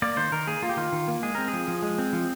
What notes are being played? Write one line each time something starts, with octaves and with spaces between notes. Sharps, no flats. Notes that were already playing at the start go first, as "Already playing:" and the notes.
A#3 D5
D#3 C5
D#3 A#4
A#3 G#4
A#3 F4
G4
D#3 F4
D#3
A#3
G#3 G#4
C4 A#4
G#4
F3
F3
G#3
C4
F3